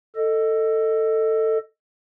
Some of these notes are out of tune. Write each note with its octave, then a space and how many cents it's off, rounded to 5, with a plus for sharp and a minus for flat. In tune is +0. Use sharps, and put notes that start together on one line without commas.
A4 +15 D#5 -5